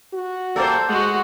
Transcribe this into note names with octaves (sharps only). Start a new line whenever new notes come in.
F#4
A#3 G4 A4 C5 D5
G#3 F#4 F#5